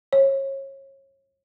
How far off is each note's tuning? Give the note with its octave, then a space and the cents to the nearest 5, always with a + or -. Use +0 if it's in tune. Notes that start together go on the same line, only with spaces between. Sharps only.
C#5 -30